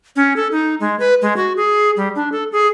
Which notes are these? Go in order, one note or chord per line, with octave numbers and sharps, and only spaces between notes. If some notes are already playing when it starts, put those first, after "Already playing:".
C#4
A4
D#4
G#3
B4
G#3
F#4
G#4
G3
D4
A4
G#4